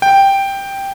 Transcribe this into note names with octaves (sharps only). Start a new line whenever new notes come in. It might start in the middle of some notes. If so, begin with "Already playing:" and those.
G5